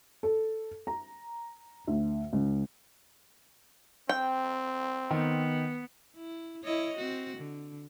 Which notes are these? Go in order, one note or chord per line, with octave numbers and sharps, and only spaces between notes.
A4
A#5
D2
C#2
C4 G5
D#3 B3
E4
E4 C#5 D#5
C4 F#4
D3